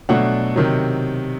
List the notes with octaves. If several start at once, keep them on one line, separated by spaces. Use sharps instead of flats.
B2 F#3 A3 D4 F#5
C3 D#3 F#3